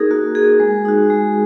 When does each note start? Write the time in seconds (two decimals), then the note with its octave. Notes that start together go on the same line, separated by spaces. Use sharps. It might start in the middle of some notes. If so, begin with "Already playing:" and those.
Already playing: A#3 D#4 F#4 G#4 A#4
0.10 A#3 F#4
0.35 D#4 F#4 G#4
0.60 G#3
0.85 D#4 F#4
1.10 G#3